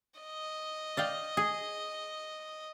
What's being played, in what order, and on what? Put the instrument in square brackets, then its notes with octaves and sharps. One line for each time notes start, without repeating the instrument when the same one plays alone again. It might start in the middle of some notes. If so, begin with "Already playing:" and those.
[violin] D#5
[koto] D5 F5 G5
G#4